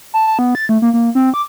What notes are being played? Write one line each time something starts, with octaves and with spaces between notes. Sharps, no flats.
A5
A5
B3
A6
A3
A#3
A#3
C4
D6